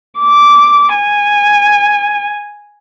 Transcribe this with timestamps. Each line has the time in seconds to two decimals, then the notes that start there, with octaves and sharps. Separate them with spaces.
0.20 D6
0.94 G#5